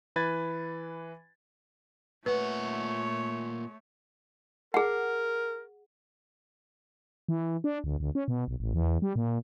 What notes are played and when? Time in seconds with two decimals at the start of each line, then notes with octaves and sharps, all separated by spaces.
0.16 E3 B4 G#6 A6
2.26 A#2 A3 B4 C#5 F#5
4.74 G#4 A#4 F#5
7.29 E3
7.64 D4
7.84 D2
8.00 D2
8.15 C#4
8.28 B2
8.48 B1
8.60 A1
8.74 E2
9.02 G3
9.16 A#2